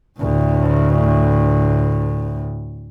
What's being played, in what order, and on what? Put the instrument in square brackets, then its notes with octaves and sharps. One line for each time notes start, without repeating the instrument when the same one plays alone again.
[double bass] D2 A2